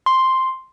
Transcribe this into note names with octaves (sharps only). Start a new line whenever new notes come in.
C6